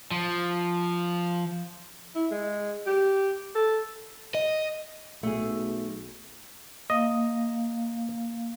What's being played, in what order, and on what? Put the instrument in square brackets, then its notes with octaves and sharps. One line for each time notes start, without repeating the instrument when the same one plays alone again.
[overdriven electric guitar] F3
[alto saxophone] E4
G#3
G4
A4
[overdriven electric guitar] D#5
[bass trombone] B1 [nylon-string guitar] A3 G#4
[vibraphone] A#3 F5 [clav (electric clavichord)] D#5